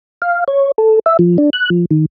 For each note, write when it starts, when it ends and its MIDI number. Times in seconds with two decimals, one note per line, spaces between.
0.22 0.44 77
0.48 0.71 73
0.78 0.99 69
1.06 1.17 76
1.19 1.37 53
1.38 1.50 62
1.53 1.70 90
1.70 1.85 53
1.91 2.06 51